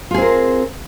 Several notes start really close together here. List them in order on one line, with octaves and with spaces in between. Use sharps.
F4 G#4 C4 A#4